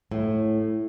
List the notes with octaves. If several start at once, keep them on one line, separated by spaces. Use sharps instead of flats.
A2